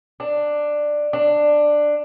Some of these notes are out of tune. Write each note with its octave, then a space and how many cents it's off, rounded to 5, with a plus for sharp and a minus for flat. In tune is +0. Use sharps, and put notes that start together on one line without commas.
D4 +10
D4 +10